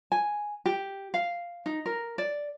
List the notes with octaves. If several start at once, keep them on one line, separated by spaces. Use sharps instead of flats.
G#5
G4
F5
D#4
A#4
D5